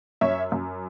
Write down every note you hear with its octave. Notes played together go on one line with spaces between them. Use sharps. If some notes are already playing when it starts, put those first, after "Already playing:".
F#2 C#5 E5
F#2